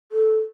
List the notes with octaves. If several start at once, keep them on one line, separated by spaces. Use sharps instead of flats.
A4